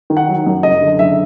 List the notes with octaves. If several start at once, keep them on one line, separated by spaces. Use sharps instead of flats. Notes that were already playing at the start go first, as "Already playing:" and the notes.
D#3
F#5
F#3
F#2
F#1 D#5
D3
F#1 E5